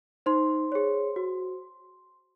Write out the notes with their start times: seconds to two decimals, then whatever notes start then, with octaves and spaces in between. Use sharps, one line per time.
0.26 D#4 C5 C6
0.72 G#4 C#5
1.16 F#4